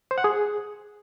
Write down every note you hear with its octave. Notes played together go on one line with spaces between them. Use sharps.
C5
F#5
G#4